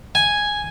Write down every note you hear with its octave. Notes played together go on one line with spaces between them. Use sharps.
G#5